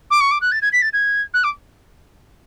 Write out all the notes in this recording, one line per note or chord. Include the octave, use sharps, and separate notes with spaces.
D6
C#6
D6
F#6
A6
G#6
B6
A6
G#6
F#6
D6